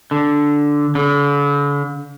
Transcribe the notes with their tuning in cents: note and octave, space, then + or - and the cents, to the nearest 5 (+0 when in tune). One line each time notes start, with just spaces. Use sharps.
D3 -5
D3 -45